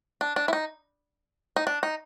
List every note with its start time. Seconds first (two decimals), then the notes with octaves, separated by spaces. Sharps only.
0.21 D4
0.36 D4
0.48 E4
0.53 D#4
1.56 D#4
1.67 D4
1.83 D#4